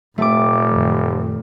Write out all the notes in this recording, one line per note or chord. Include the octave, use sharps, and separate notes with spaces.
F1 A#2 A3 C4 D6
F#2 D#3 F3